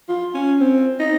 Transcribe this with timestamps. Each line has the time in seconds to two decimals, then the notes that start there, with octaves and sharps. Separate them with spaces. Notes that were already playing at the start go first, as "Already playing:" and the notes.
0.09 F4
0.34 C#4
0.60 C4
0.99 D#4